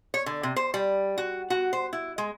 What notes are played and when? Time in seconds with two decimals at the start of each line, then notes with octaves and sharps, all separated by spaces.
0.14 C#5
0.26 D3
0.43 C3
0.56 C5
0.74 G3
1.18 F#4
1.50 F#4
1.73 C5
1.93 E4
2.18 G#3